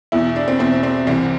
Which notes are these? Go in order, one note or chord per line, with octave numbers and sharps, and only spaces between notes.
E2 B2 E4
D4
C4
E2 B2 C4
C4
C2 C3 E3 C4